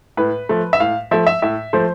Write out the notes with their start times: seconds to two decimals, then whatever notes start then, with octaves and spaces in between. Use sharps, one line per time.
0.17 A2 B4
0.49 F3 A3
0.73 E5
0.80 A2 F5
1.11 F3 A3 E5
1.27 E5
1.42 A2 E5
1.73 F3 A3 C5